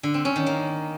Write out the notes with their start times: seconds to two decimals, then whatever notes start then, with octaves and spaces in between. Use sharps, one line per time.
0.03 D3
0.14 C4
0.25 C#4
0.36 D#3
0.46 A#3